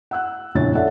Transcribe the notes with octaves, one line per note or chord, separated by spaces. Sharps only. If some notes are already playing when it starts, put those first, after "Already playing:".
F#5 E6 F#6
A#1 F2 C#3 E4 C#5 A6
A4 C#5 D5 E5 F#5